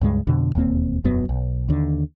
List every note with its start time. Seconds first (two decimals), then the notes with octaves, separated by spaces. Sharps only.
0.01 C#2 G2 G#3
0.27 F2 B2 D3
0.55 E1 D#2 A#3 C4
1.04 E1 F#2 F#3 B3
1.29 B1
1.68 D#2 D3